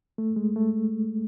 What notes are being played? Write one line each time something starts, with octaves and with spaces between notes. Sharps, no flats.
A3
G#3
A3